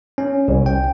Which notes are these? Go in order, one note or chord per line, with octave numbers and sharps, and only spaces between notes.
C#4
C2
G5